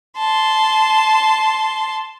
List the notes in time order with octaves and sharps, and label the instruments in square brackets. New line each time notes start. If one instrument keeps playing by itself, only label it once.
[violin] A5 C6